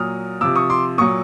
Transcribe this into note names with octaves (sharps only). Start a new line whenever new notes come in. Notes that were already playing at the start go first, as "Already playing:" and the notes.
Already playing: A#2 F#3 D#6 F6
C3 F3 D6 E6
C#6 D#6
C6 D6
A#2 F#3 C#6 D#6